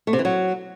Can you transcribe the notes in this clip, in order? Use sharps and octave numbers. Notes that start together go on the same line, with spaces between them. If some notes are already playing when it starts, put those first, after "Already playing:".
A3
C3
E3
F#3